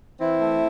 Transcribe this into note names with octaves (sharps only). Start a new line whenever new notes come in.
E3 C4 E4
A3